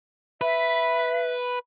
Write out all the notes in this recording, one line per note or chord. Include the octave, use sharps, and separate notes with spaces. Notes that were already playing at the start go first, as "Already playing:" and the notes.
B4 E5